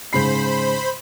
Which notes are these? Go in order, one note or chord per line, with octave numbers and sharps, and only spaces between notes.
G#2 C#3 C5 B5 C7